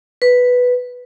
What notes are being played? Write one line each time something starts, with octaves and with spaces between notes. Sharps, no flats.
B4